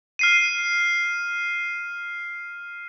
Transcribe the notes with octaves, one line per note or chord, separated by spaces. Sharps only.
F6 C7 D#7